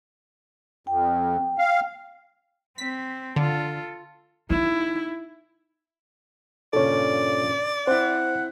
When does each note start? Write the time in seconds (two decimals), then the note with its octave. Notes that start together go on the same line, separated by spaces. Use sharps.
0.87 F2 G5
1.58 F5
2.78 C4 B6
3.36 D3 F4 A4
4.50 D#4 E4
6.73 G2 A#2 C#3 A4 C#5 D5
7.87 C4 E4 C5 F#5